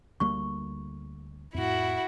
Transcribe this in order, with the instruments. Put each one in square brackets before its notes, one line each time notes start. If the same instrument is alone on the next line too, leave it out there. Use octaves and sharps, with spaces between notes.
[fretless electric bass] D2 G3 A#3 [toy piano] C#6
[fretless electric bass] F2 A2 [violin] E4 F#4